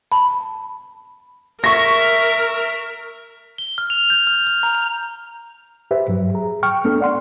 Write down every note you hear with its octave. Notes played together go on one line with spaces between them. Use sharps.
A5 B5
A#4 E5 C#6 A#6
G7
F6
F7
G6
F6
F6
A#5
A#5
G4 B4 C5 E5
G2 F#3
G#4 A#5
G5 C#6 F6
A3 B3 D4 A4
D5 F#5 C6